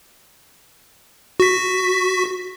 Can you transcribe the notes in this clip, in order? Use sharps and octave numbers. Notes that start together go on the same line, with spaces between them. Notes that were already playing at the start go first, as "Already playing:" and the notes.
F#4 B6